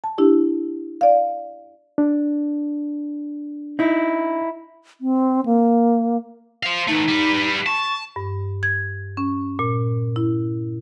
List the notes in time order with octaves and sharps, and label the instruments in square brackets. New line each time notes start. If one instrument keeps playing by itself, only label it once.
[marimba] A5
D4 E4 G4
D5 F5
[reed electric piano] D4
[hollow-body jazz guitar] D#4 E4
[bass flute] C4
A#3
[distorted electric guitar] C5 F5
[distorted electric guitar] E3 A3 [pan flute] D#4
[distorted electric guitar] G3 B4
[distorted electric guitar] A5 [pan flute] C#6
[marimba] G2
G#6
C#4
A#2
E4